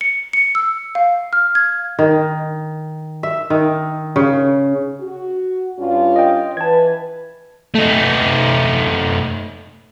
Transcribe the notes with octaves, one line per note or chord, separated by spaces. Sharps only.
C#7
C#7
E6
F5
F6
G#6
D#3
E5
D#3
C#3
F#4
G2 C#4 F4
D#5 G5
E3 B4 A5 G#6
A3 D#4